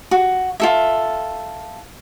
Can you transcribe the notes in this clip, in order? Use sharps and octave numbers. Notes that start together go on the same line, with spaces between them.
F#4
F4 A4 E5